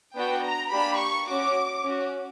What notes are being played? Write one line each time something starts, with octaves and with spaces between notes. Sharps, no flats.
B3 D4 F#4 G5
A#5
A#3 D4 G4 B5
C#6
C#4 F#4 D6
C#4 F#4